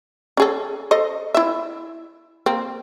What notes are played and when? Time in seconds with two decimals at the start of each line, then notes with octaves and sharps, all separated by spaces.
0.37 C#4 G#4 A4
0.91 A4 C5 D#5
1.34 E4 E5
2.46 A#3 C4